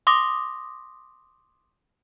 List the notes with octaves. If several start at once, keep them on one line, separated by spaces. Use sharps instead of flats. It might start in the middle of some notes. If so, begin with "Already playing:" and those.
C6 D6 D#6 A#6